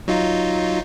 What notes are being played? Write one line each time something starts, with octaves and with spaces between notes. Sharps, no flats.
F#3 D#4 F4